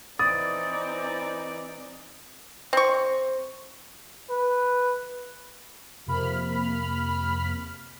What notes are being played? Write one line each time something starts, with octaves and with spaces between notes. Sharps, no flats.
E3 C4 D#4 D5 D#6 A6
C4 C#6
B4
F2 C3 A#3 B5 F6